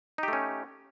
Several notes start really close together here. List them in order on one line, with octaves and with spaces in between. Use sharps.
D#4 G4 A3 C#4